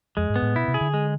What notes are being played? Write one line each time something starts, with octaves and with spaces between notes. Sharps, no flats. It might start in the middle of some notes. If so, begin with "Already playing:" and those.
F2 G#3
G#2
B3
A2
B2 E4
C3
G#4
D3
G#3